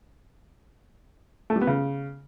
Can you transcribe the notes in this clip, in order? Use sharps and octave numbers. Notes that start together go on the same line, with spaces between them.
A3
G3
B3
C#3